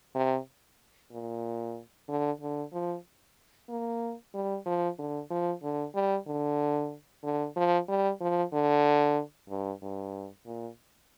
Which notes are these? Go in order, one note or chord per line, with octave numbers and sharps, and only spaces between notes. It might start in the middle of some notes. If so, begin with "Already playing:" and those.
C3
A#2
D3
D3
F3
A#3
G3
F3
D3
F3
D3
G3
D3
D3
F3
G3
F3
D3
G2
G2
A#2